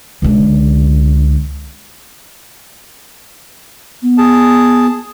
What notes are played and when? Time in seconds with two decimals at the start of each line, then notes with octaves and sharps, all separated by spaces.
0.22 C#2 D3
4.02 B3
4.18 G#4 A5